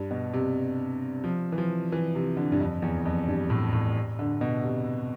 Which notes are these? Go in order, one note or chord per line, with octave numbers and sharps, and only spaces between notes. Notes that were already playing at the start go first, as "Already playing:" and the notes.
Already playing: G2
B2
C3
F3
E3
F3
E3
C3
D3
G2
F2
E2
F2
G2
A2
A2
D3
B2
C3